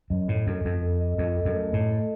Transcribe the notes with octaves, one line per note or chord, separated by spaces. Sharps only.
F#2 D#5
A2 D#5
F#2 A4
F2 D#5
A4
D#5
F2 D#5
A4
F#2
A3
A2 A3
A4